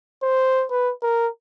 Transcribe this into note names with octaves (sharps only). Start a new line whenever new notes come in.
C5
B4
A#4